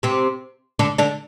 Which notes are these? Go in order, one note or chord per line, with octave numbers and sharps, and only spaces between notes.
C3 C4
D3 D4
D3 D4